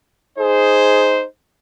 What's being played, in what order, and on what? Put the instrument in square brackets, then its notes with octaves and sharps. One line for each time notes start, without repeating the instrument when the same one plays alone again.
[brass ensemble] D#4 G#4 C5